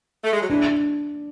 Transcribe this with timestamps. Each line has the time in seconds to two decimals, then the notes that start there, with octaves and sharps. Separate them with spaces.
0.24 A3
0.33 G#3
0.41 F#3
0.49 E3 D4